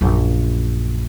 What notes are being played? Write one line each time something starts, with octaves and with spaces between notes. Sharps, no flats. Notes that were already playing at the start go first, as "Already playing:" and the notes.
A#1 F#2